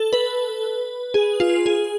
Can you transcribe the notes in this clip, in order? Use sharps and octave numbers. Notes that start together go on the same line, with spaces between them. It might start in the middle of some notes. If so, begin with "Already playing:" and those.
Already playing: A4
B4
G#4
F4
G#4